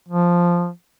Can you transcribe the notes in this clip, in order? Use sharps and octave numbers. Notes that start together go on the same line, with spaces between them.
F3